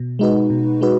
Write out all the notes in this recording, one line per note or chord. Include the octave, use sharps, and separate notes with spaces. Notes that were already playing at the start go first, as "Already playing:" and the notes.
Already playing: B2
G#3 D#4 F#4 B4
B2
G#3 D#4 F#4 B4